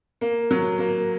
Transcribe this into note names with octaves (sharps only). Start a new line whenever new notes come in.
A#3
F#3
A#3